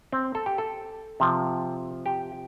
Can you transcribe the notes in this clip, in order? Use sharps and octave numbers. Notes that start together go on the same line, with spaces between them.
C4
A4
G4
A4
C3 F3
G4